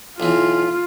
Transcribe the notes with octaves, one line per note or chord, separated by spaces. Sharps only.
B1 E3 F4